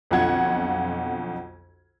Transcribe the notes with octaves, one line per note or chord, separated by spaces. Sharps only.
B1 F2 D3 F4 F#5 G#6